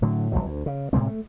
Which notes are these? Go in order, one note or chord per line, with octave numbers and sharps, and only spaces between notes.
A2 D3 F#3
G1 D2 F3 F#3
D2
C#3
A2 C3 G#3 C4
A3